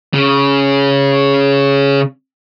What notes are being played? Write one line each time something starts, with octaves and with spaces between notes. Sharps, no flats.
C#3